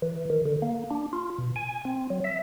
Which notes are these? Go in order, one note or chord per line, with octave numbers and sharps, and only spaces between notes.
E3
D#3
D3
A#3
D4
F4
B2
G#5
C4
F#3
E5